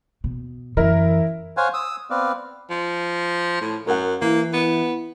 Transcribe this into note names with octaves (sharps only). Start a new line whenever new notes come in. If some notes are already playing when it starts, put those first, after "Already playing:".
B2
F#2 E3 E4 A#4
C5 C#5 F5 F#5 G#5
D#6 E6
B3 C4 B4 D5 F5
F3
A2
F#2 A#4 F#5
E3 A#3
B3